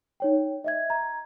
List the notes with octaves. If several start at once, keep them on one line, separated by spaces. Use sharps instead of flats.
D#4 C#5 G5
D#5 E5 G#6
A#5 G#6